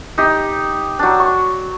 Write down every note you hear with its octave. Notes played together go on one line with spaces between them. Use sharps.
D#4 G4
F#3 D4
C#6